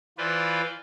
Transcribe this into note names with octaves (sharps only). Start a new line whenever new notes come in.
E3 F4 B4 C5 D5